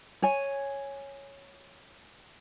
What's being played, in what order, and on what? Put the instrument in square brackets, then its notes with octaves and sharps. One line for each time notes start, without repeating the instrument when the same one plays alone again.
[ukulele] C#5 G#5